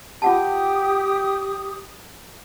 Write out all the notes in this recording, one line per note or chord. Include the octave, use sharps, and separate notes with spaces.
F4 G4 F#5 A5 D#6